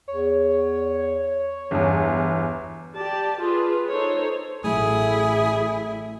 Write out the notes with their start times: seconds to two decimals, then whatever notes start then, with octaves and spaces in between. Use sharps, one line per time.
0.08 E2 C#5
1.71 G1 E2 E3
2.95 G4 D5 A5
3.40 F4 G#4 B4
3.89 D#4 A4 C5 C#5
4.64 A1 F#3 A3 E4 G#4